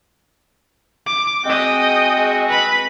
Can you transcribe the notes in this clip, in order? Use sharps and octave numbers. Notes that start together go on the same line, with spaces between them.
D6
G#3 C4 F#4 D#5 G5
B4 B5